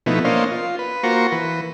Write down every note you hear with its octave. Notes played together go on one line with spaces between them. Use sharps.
B2 F3 A3 B3 D#4 E4
A#3 C#4 D4 C5 D#5 F5
F4
B4
A#3 F4 F#4 C5 A#5 C#6
E3 B4